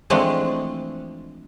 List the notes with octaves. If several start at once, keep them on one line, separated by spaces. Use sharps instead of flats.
E3 F3 G#3 A3 C4 D4